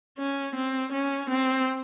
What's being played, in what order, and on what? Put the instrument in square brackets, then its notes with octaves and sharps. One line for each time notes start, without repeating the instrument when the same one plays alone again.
[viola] C#4
C4
C#4
C4